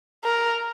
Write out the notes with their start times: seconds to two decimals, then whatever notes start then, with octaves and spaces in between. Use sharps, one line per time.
0.23 A#4